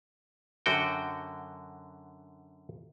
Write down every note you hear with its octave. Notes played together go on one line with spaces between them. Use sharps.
F#2 D3 F#4 G5